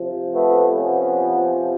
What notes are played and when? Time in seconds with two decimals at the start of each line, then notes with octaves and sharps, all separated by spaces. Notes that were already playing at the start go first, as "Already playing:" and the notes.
Already playing: C3 F3
0.33 A3 B3
0.76 B3 C#4